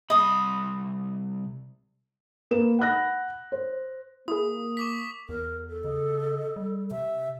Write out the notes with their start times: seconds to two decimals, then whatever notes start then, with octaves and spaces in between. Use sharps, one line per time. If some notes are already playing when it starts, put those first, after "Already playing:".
0.10 C2 D#5 B5 D#6
2.51 A#3 B4 E7
2.79 F#5 B5 F#6 A#6
3.52 C5
4.28 A#3 E4 G#4 D#6
4.77 C#6 D6 B6
5.29 E2 A#4
5.69 A4
5.84 C#3 D#5
6.56 G3
6.91 C3 E5